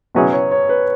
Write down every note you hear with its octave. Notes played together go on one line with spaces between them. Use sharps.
B2 F#3 C#4 E4 G#4 B4
C#5
C#5
B4